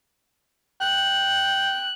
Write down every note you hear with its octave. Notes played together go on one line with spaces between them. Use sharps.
G5 F#6